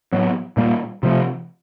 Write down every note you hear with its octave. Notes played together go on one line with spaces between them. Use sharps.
A2 F#3 B3
A#2 G3 A#3
C3 F3 A3